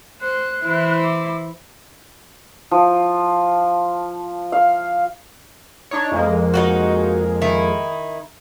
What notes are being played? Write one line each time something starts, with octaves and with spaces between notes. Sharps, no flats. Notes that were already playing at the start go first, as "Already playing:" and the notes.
C5 F#6
E3 E4 C5
D6
F3
F5
D4 D#4 C#5
F2 G#3 A#3
D#4 F4 F#4
D#3 D#4 E4